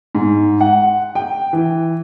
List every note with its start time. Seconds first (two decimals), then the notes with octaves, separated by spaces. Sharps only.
0.15 G#2
0.61 F#5
1.15 G5
1.53 E3